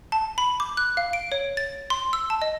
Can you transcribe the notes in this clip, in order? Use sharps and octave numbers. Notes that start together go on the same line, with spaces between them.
A5
B5
D6
F#6
F5
D7
C#5
A6
C6
E6
A5
D#5